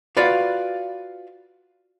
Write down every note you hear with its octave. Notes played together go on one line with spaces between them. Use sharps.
F4 F#4 B4 D5 F5